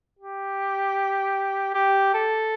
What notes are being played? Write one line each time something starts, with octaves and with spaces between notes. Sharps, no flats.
G4
G4
A4